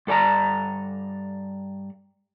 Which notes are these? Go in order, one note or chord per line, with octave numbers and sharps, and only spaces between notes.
G2 A4 D5 A5 A#5